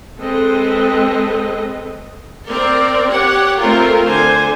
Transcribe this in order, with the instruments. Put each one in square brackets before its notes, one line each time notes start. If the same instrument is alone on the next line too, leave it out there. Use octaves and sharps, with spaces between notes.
[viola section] G#3 C4 A4 B4 D#5
[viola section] C4 A#4 [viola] D5
[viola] G4 [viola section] C#5 F#5
[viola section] A3 C4 F4 [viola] A#4
[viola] D3 G#5 [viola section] C5